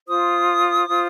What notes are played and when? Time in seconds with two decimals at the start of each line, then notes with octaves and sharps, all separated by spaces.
0.07 F4 C5 D#6
0.88 F4 C5